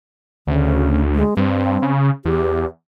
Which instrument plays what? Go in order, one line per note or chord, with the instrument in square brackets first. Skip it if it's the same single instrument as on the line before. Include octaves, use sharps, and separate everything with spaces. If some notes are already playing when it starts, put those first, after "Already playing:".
[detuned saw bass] D2 [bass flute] C#3
[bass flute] G#3
[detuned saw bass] G2 [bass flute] C4
[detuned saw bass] C#3
[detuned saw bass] E2 [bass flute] G4